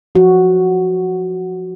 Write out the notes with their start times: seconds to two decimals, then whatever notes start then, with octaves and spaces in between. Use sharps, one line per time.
0.15 F3 F#4